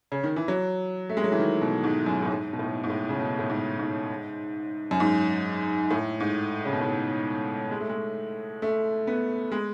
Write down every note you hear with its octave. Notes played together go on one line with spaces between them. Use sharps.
C#3
D#3
E3
F#3
A3
G#3
F#3
E3
D#3
B2
G#2
F#2
A2
G#2
B2
A2
G#2
A2
C#3
B2
A2
G#2
G#2
F#2
G#2
A2
G#2
C#3
B2
A2
G#3
A3
G#3
A3
B3
G#3